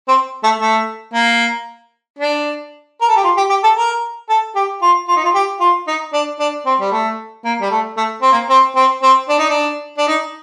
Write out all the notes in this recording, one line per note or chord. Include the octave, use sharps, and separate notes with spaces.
C4
A3
A3
A#3
D4
A#4
A4
G4
F4
G4
G4
A4
A#4
A4
G4
F4
F4
D#4
F4
G4
F4
D#4
D4
D4
C4
G3
A3
A#3
G3
A3
A3
C4
A#3
C4
C4
C4
D4
D#4
D4
D4
D#4